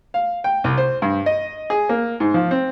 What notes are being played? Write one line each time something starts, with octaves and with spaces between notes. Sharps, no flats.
F5
G5
C2
C5
G2
D#5
G#4
A#3
G#2
F3
C4